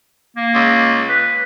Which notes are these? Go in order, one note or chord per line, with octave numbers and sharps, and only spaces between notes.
A#3
C#2
B4